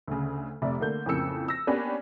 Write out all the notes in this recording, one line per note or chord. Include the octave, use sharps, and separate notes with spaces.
D2 C#3
F1 C3 D5 E5
D3 A3 A#3 G6
F2 A2 C#3 A#3 E6 C#7
E6 A#6
A#3 B3 C#4 D4 G4 B4